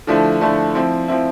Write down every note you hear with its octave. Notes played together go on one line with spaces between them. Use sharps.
D3 F3 A3 E4
D3 F3 A3 E4
F3 C4 E4
F3 C4 E4